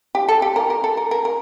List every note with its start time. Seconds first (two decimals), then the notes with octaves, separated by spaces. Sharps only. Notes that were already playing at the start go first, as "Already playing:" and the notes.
0.15 G4
0.29 A4
0.42 G4
0.56 A#4
0.70 A#4
0.84 A4
0.97 A#4
1.11 A#4
1.25 A#4